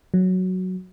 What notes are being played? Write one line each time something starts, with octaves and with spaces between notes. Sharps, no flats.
F#3